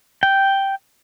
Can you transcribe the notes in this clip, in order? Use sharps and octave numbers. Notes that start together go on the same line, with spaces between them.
G5